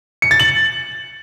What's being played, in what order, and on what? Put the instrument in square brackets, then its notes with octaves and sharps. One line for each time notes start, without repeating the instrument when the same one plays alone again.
[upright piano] C#7
A6
F#7